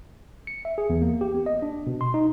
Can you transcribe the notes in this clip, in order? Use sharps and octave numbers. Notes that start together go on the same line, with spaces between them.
C#7
E5
G#4
E2
A#3
G4
B3
D#5
D4
B2
C6
D#4